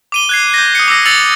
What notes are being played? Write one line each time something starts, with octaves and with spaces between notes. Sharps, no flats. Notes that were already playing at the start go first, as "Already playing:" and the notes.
D6 D#7 G7
F#6 G#6 C7
G6 A#6
D#6 C#7
D6 E6 A#6
E6 A6 C#7 F7 F#7